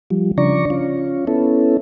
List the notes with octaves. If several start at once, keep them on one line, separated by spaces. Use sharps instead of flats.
F3 G3
C#3 F3 D4 D5 A#5 C#6
C#4 F4
B3 C#4 E4 A4